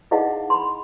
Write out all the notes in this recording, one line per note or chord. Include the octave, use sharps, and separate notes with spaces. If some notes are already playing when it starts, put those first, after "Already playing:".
D#4 E4 G#4 D#5 F5 F#5
B5 C6